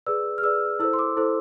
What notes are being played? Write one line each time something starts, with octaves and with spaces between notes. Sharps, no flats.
G#4 B4 D5 E6
F6
G#4 B4 D5 E6
E4 A4 C5 E6
C6
D6
E4 A4 C5